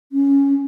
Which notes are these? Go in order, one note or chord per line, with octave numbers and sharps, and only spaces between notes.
C#4